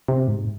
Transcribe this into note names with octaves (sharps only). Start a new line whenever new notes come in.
C3
G#2